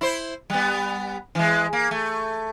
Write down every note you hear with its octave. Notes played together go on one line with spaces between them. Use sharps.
E4 C5
G3 B3
E3 G#3
A#3
A3